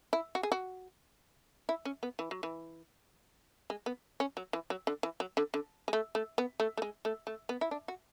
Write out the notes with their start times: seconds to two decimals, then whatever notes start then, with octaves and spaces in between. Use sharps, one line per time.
0.13 E4
0.35 F#4
0.43 G#4
0.52 F#4
1.69 E4
1.85 C#4
2.03 B3
2.19 E3
2.31 F#3
2.43 E3
3.70 G#3
3.86 B3
4.20 C#4
4.37 F#3
4.53 E3
4.70 F#3
4.87 D3
5.03 E3
5.20 F#3
5.37 D3
5.54 D3
5.88 G#3
5.93 A3
6.15 A3
6.38 B3
6.60 A3
6.77 A3
6.82 G#3
7.05 A3
7.27 A3
7.49 B3
7.61 E4
7.71 D4
7.88 F#4